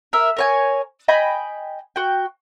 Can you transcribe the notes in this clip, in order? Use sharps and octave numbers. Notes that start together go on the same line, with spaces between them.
A#4 E5
A#4 C#5 G#5
D#5 G5 G#5 B5
F#4 G5